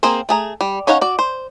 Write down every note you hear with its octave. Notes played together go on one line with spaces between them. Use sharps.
A#3 C4 G#4 A#4 C5
A3 G#4 A#5
G3
C#4 D#4 C#5 F5 F#5
F#4 D5
C5